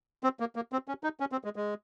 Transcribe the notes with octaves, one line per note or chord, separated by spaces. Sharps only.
C4
A#3
A#3
C4
C#4
D#4
C#4
C4
G#3
G#3